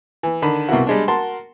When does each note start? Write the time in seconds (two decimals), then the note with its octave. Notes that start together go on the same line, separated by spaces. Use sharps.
0.23 E3
0.42 D3 D#3 B5
0.69 C2 B2 A#3 E4 F#4
0.87 G3 G#3 D4
1.08 F#4 A#4 A5 C6